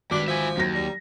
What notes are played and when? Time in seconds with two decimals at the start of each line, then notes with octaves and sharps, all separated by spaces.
0.11 G#1 G3 D4 F#4 B4 D6
0.28 F3 E5 G#5
0.57 D#2 F#3 A#6
0.74 G3